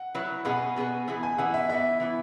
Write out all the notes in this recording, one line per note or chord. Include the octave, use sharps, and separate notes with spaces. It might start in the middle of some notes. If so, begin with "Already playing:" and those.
Already playing: F#5
F#3 E4 B4
B2 B3 G#4 B4 F#5
B2 B3 G#4 B4
E3 B3 E4 G#4
G#5
E3 B3 E4 G#4 F#5
E5
E3 B3 E4 E5
E3 B3 E4